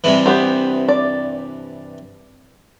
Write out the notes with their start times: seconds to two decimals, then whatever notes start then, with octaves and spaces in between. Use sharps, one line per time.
0.04 G2 C3 E3
0.26 B3 G4 C5
0.89 D5